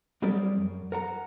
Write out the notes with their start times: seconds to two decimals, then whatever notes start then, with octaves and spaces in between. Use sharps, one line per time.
0.22 F#3 G3 C4 G#4 A#4 D5
0.57 F#2
0.92 A#4 F#5 A#5